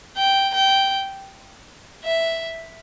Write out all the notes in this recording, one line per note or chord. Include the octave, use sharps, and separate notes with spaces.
G5
G5
E5